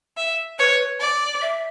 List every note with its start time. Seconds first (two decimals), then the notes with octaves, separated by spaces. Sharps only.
0.17 E5
0.59 B4 C#5
1.00 D5
1.41 E5